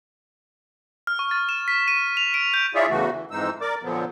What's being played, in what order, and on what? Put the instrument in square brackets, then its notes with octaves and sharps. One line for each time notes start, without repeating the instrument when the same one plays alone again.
[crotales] F6
C#6
A6
E7
B6
D#7
F7
D7
G6
[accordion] E4 F4 G#4 C#5 D5 E5
E2 C#3 E3 A3 F#4
E3
F2 G#2 E3 G#3 D#4 E6
A#4 D5 D6
A#2 D3 F3 F#3 B3